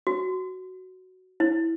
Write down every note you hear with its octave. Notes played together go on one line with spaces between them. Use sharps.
F#4
E4